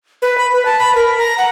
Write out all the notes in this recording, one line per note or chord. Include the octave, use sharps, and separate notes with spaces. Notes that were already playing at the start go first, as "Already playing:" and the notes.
B4
B5
B4
A5
B5
A#4
A#5
F#5